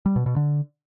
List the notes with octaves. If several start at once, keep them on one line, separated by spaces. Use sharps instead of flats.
G3
B2
B2
D3